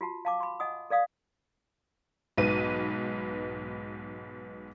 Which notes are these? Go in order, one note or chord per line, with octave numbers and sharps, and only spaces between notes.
F4 F#4 A5
F5 A5 D6
B5 C6
D#5 F#5 G#5 D#6
A4 D5 F5 D#6
B1 G#2 B4 D#7